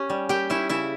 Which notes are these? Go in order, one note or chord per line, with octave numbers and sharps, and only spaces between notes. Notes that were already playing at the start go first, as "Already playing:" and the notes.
Already playing: C#4 G4
G3
G3 G4 G5
C#4 E4 E5
C#3 E4 E5